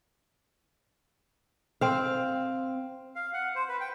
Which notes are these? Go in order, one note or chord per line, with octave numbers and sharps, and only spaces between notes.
C4 F5
F5
F#5
C5
B4
G5